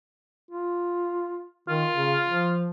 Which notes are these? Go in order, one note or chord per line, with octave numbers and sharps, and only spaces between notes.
F4
D#3 F4
C#3
F3